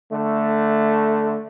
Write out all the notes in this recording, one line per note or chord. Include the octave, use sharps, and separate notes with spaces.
D3 A3